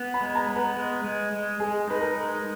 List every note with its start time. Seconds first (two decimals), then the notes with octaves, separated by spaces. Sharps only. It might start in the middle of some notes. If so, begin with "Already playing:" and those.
Already playing: B3
0.14 B5
0.21 G#3
0.35 A#5
0.49 B3
0.56 B4
0.77 G#3
1.04 G#3
1.32 G#3
1.60 G#3 G#4
1.88 D#4 B4
2.01 A#4
2.16 G#3